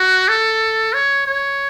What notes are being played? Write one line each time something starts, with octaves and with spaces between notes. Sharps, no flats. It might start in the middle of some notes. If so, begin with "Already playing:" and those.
Already playing: F#4
A4
C#5
C#5